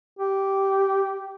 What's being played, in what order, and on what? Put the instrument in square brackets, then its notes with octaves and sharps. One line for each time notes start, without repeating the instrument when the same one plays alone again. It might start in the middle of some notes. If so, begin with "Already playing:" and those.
[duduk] G4